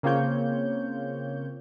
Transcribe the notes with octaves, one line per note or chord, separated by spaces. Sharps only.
C#3 A#3 C4 F4 C#5 G6